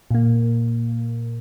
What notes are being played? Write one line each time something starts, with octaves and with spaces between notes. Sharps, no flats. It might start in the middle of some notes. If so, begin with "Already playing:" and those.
A#2 A#3